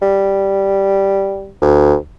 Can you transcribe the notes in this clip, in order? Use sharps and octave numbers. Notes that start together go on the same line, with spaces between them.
G3
D2